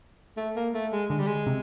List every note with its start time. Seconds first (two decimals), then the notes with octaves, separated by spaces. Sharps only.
0.37 A3
0.56 A#3
0.74 A3
0.92 G#3
1.10 D3 G#3
1.19 G3
1.27 G#3
1.47 C3